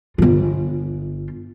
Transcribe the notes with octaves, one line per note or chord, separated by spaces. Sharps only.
G1 F4